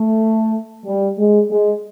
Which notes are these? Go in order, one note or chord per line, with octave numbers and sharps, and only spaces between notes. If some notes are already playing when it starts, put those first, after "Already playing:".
Already playing: A3
G3
G#3
G#3